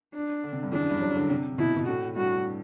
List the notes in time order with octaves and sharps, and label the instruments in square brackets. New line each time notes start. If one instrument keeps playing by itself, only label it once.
[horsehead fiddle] D4
[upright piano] D3
C3
G2
[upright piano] E2 [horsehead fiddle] D4
[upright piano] F#2
G2
F#3
D3
C3
[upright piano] B2 [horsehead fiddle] E4
[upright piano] B2
[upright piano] A2 [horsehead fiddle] F#4
[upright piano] G2 [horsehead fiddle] F#4